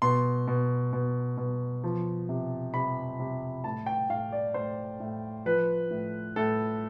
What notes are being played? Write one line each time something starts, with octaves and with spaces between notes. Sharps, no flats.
B2 C6
B2
B2
B2
F3
C3
C3 B5
C3
A2 A5
G5
A2 F5
D5
A2 C5
A2
F3 B4
A2
A2 A4